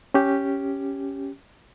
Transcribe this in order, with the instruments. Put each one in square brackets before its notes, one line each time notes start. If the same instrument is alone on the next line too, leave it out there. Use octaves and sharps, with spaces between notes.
[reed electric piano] C#4 G4